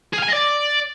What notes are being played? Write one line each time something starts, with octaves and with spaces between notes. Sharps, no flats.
G#4
F5
G#5
D#5
D5